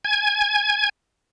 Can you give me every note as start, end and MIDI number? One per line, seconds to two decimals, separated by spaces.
0.05 0.89 80
0.05 0.89 92